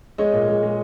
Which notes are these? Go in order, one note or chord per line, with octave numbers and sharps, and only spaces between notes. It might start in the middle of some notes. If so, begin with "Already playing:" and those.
G#3 C#5 D#5
A#2
G#3
G#3